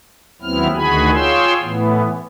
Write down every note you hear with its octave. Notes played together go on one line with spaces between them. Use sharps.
D#2 F#3 B3 C4 E4 F6
D2 D#3 F#4 G#4 G#5 B5
F4 G#4 C#5 G5 C6 E6
A2 E3 B3